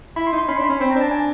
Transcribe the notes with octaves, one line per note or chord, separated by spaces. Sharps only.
E4 B5
C6
D#4
C6
C#4 B5
D4 B5
C#4
C4 B5
A#5
D4 A5
G#5